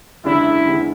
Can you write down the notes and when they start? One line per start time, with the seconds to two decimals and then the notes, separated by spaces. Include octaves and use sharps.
0.24 F#1 E2 C#3 G#3 D4 E4
0.66 F#1 E2 C#3 G#3 D4